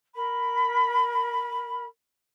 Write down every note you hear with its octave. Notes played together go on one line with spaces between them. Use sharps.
A#4 B5